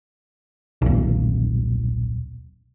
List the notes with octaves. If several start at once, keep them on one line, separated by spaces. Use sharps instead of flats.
D#1 B1